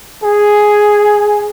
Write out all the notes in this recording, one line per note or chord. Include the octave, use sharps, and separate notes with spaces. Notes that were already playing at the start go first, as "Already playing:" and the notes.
G#4